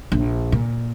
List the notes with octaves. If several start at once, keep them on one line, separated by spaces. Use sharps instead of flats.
A#1
A#2